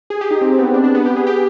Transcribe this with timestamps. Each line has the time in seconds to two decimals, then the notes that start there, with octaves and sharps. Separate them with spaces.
0.10 G#4
0.21 G4
0.31 D#4
0.41 C4
0.52 C4
0.58 B3
0.63 C4
0.74 D4
0.84 D4
0.95 B3
1.06 G4
1.16 G#4
1.27 G4